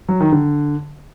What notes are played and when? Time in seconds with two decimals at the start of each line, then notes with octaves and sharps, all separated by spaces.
0.09 F#3
0.20 D#3
0.32 D3